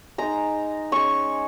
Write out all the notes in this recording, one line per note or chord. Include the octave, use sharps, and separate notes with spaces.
G#3 D#4 A#5
G#3 C#4 C#6